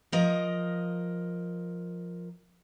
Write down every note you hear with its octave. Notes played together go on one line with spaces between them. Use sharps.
F3 A#4 D#5